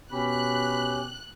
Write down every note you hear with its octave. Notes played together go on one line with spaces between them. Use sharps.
B2 C#4 G4 B5 F#6